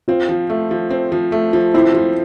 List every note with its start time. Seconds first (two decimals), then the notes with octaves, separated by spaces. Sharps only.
0.08 C4 F4
0.29 F3
0.50 A3
0.71 F3
0.90 C4
1.12 F3
1.32 A3
1.53 F3
1.74 C4 E4
1.94 F3